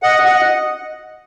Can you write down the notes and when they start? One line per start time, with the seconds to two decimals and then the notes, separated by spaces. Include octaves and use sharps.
0.03 D#5 F#5
0.25 D#5 F#5